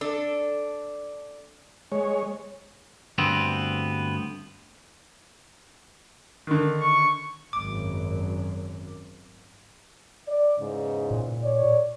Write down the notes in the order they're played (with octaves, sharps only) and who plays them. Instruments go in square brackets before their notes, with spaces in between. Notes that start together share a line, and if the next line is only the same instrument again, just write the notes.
[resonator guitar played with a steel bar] D4 A4
[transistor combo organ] G#3 C#5
[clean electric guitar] D2 G2 B3 C4
[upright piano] D3 D#3
[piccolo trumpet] C#6
[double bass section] G#1 F#2 [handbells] D6
[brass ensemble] D5
E2 G#2 C#3
[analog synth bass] A#2
[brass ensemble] C#5 D5